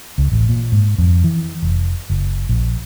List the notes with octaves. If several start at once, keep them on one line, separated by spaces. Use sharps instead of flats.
C#2
A1
A#2
G#2
F2
E3
F1
F#1
A#1